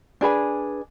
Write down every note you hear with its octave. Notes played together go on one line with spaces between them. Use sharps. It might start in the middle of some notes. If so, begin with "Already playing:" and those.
D4 G#4 B4 G#5